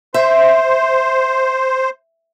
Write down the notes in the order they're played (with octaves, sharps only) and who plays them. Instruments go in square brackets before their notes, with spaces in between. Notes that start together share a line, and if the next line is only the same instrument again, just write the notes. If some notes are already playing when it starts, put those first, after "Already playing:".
[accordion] C5 [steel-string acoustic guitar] E5